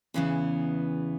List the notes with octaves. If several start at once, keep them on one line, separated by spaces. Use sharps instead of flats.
E2 C#3 E3 B3